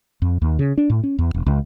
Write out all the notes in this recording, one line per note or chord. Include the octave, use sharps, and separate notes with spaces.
F2
D#2
C#3
D4
A2
C#4
E2
E1
C#2